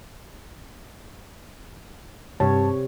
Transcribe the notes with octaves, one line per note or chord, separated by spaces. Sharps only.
G2 C3 G4 C#5 A5